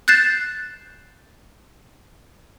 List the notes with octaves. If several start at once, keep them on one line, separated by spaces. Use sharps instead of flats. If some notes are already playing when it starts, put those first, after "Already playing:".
F#6 G6 A6 C7 E7